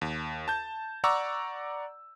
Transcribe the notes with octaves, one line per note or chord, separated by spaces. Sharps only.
D#2
A5 G6
D5 F#5 A#5 C#6 D6 E6